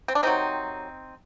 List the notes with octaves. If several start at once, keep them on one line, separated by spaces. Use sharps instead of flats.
C4
D4
C3 D#3 F#3 C4 D#4